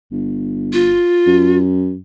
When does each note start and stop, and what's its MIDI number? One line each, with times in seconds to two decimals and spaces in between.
0.12 1.01 31
0.73 1.58 65
1.27 1.98 42